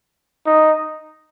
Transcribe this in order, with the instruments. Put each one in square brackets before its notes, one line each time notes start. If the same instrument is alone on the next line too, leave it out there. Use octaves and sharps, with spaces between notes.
[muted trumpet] D#4